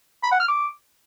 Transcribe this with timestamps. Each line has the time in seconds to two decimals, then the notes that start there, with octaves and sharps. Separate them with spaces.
0.23 B5
0.32 F#5
0.40 F6
0.48 D6